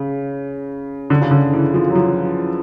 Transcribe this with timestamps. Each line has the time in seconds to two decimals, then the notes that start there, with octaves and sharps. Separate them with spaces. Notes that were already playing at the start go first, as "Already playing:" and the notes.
Already playing: C#3
1.10 D3
1.21 C#3
1.31 D3
1.54 E3
1.74 F3
1.90 F#3
1.95 F3